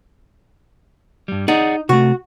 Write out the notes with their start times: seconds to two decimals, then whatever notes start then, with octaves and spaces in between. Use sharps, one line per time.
1.28 G2 G3
1.48 D#4 G#4 D5 F#5
1.89 C3 A3 F#4